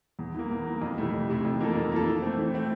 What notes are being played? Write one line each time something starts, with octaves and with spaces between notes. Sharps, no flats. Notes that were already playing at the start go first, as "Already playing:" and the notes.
E2
E3 A#3
E2
E3 A#3
F2
C3 E3 A3 E4
F2
C3 E3 A3 E4
F2
E3 A#3 F4 A4
F2
E3 A#3 F4 A4
E3
A3 C4
E3
A3 C4